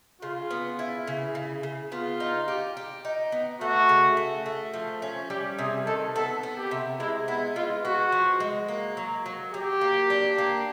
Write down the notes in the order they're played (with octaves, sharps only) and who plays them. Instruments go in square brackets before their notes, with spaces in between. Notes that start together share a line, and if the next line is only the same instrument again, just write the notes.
[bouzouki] C#3 [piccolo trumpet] F4
[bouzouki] B3
E4
C#3
C#3
C#3
[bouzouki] B3 [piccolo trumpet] F4
[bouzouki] D#4
G4
G4
D#4
B3
[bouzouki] A3 [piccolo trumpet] F#4
[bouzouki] C#3
A3
A3
F3
C#4
[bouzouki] G3 [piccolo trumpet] G4
[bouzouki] C3 [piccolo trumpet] G#4
[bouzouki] D#3 [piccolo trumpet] A4
[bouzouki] B3 [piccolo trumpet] A4
[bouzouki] B3
[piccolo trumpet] G4
[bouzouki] C3
[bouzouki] G#3 [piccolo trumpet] E4
[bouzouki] B3 [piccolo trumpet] E4
[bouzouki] G#3 [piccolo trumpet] F4
[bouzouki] B3 [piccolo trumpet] F#4
[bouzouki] F3
G#3
A#3
F#3
F#3
[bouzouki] F#3 [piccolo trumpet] G4
[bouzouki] A#3
D4
A#3